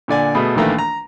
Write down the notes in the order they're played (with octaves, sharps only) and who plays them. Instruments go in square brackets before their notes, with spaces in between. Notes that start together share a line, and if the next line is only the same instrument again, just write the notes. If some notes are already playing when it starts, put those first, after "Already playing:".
[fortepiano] A#2 D3 D5 G#5
B2 A3 G#4 B5
A#1 D#3 E3 A3 A#3 A#5
A#5